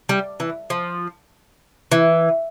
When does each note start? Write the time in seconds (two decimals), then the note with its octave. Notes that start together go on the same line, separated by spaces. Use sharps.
0.09 G3
0.40 E3
0.70 F3
1.92 E3